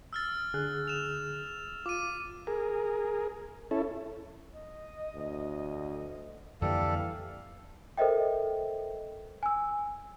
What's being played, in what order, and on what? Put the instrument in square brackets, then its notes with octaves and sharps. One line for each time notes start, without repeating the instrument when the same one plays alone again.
[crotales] E6 F6 A6
[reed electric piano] D3 G#4 F#6
[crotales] E7 F7
[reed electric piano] F4 [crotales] D6 D#7
[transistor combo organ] G#4 A#4
C#4 E4 A4
[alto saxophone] D#5
[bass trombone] D2
[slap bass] F2 D3 A#3 [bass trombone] E3 [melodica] G3 A4 [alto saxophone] F5
[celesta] A4 A#4 C5 D#5 E5 G5
G#5 E6